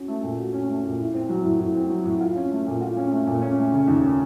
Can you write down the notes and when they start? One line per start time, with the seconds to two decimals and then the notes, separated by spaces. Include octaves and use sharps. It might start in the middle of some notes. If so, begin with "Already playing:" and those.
Already playing: C#4 F#4
0.08 A3
0.22 A#2
0.39 F#4
0.53 C#4
0.69 A3
0.84 A#2
0.99 A2
1.14 C4
1.29 F#3
1.44 A2
1.59 A2
1.74 C4
1.90 F#3
2.05 A2
2.21 F4
2.35 C#4
2.51 A3
2.66 A#2
2.81 F4
2.97 C#4
3.11 A3
3.27 A#2
3.42 C#4
3.58 A3
3.72 C#3
3.87 D#2
4.03 C#4